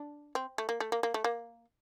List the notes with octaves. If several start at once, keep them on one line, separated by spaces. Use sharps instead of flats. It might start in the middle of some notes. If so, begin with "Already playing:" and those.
Already playing: D4
C4
A3
A#3
A3
A#3
A#3
A3
A#3